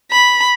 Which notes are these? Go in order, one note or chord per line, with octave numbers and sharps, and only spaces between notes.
B5